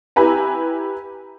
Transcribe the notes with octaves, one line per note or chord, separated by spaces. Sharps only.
E4 G4 B4 G#5 A#5